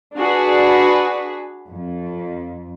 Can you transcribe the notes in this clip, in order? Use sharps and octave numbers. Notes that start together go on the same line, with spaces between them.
D4 F#4 G#4 B4
F2